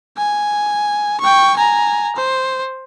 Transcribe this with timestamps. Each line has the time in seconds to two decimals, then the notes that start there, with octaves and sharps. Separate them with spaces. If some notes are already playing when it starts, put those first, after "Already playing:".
0.17 G#5
1.20 G5 C#6
1.56 G#5 A#5
2.16 C5